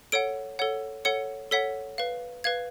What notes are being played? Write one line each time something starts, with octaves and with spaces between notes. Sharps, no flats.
A4 C#5 F#5 D7
A4 C#5 F#5
A4 C#5 F#5 C#7
A4 C#5 F#5 B6
B4 F5
B4 F5 G#6